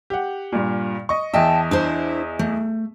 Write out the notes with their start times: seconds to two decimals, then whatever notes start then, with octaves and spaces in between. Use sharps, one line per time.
0.10 G4 F#5
0.52 G2 A#2
1.09 D#5 C#6
1.34 E2 D#5 E5 G5 A5
1.71 D4 E4 C5
2.39 A3